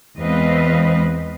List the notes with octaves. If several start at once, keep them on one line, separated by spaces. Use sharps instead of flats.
E2 G#3 C4 B4 D#5 F5